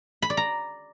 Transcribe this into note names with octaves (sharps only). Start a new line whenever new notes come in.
B5
D5
A#5